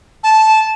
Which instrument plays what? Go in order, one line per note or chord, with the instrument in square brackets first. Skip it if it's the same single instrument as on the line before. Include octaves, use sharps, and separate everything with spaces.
[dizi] A5